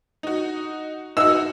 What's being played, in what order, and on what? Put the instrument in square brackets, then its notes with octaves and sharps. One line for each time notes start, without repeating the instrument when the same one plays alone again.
[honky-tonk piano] D#4 F#4
[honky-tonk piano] D#4 F#4 [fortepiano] E6